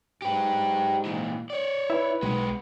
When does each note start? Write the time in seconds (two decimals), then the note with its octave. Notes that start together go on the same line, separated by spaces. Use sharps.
0.22 G#2 G4 B4
1.05 A#2 E3
1.50 C#5 D5
1.90 E4 B4
2.23 B1 G#3 B3